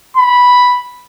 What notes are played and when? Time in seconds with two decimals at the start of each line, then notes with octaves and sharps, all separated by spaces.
0.17 B5